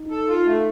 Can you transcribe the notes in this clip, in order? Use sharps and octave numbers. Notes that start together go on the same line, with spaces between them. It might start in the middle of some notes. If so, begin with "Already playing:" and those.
Already playing: D#4
A4
F4
A3